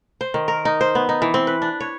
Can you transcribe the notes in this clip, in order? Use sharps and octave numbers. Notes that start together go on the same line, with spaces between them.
C5
D#3
A#4
D#4
C5
B3
D#4
E3
C4
B4
D4
C#5